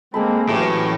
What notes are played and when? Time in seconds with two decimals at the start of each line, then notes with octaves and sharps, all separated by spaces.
0.14 G#3 A#3 C4 G#4 A4 B5
0.49 A2 E3 F#3 A3 C#4 G4